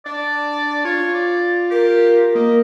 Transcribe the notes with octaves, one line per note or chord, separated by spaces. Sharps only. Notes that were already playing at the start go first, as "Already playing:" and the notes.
D4 D5
F4 C#5
D5
G4 A#4
A#3 D#5